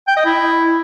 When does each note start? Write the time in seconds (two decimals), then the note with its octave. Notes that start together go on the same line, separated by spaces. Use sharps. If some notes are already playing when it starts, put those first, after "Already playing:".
0.08 G5
0.17 D#5
0.25 E4